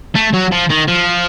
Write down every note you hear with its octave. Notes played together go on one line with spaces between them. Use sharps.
A3
F#3
F3
D#3
F3